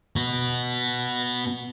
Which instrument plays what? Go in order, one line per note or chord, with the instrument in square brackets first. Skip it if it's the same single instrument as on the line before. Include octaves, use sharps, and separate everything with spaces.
[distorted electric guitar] B3 F#4